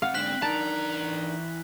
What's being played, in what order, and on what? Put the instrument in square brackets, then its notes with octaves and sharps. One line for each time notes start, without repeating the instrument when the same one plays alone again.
[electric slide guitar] C3 F#5 [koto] F5
[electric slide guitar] G#2 D3 D4 [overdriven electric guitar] C4 [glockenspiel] F#6 B6 F#7
[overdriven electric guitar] E3 A#5 [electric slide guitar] D4 D#4 A#4 [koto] A5